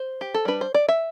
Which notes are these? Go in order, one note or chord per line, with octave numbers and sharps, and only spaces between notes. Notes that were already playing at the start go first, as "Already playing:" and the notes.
Already playing: C5
G4
A4
G3 D4 B4
C5
D5
E5